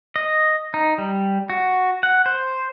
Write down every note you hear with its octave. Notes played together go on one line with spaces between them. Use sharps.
D#5
D#4
G3
F#4
F#5
C5